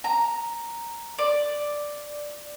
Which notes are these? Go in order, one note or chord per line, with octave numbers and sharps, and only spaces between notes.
A#5
D5